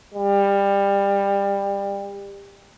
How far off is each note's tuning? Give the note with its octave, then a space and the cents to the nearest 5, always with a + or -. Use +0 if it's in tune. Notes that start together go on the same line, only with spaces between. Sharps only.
G3 +25